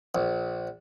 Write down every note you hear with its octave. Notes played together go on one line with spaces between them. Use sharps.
A#1